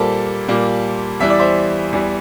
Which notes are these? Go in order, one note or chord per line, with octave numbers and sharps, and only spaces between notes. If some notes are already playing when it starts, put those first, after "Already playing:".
Already playing: A#2 G3 A#3 A4 C5
A#2 G3 A#3
E2 E3 G3 E5
D5
C5 E5
E2 E3 G3